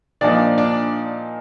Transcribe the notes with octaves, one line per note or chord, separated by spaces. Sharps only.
A#2 F3 A#3 D4 D#4 D5
D4 D5